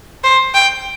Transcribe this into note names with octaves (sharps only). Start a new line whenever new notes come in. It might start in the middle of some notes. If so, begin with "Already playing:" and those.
C5
G5